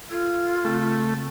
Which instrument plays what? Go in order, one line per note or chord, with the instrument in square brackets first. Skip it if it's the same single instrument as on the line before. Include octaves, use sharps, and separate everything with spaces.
[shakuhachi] F4 [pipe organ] A4 G#6
[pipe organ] C#3 C4 [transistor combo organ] A3